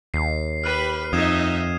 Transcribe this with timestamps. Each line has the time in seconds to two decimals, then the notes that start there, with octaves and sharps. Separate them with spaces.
0.14 D#2 C7
0.64 G4 B4 B5 F6 F#6 D#7
1.13 F2 D#4 D#5 E5 D#6 G#6 E7